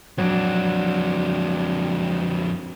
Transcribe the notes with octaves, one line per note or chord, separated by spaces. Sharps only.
F2 F#3 D4